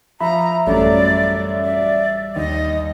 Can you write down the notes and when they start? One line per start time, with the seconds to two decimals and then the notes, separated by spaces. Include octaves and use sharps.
0.21 F3 E5 A#5 B5
0.67 A1 F#2 F#3 G3 A3 D5
1.64 D5
2.36 D#2 D#5